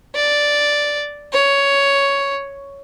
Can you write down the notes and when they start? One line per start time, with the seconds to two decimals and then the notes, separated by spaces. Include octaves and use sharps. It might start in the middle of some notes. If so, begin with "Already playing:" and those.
0.15 D5
1.33 C#5